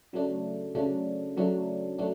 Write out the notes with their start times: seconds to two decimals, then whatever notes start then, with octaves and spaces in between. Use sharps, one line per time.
0.13 C#3 F#3 A3 D4
0.75 C#3 F#3 A3 D4
1.36 C#3 F#3 A3 D4
1.98 F#3 A3 D4